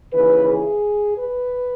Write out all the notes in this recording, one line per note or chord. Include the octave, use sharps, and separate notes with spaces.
D#2 C#3 E3 B4
G#4
B4